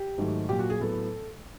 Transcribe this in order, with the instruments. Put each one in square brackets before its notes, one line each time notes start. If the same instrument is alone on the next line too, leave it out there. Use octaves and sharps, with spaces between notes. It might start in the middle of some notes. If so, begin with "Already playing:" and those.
Already playing: [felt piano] G4
G#2 D#3 F#3 A3
A#2 F#3 A#3 G4
F#4
G#4
A2 F#3 B3 A4